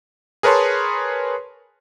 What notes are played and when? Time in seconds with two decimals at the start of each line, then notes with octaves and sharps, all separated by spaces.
0.43 G#4 A#4 B4 C#5 A5 C6